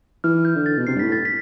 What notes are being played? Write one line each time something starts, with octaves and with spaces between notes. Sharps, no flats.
E3 F6
G6
D3
A6
B2
C3 C7
G2
A2 B6
A6
B6